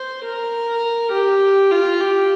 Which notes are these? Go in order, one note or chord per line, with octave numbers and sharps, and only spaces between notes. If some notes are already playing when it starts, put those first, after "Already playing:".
Already playing: C5
A#4
G4
F4
G4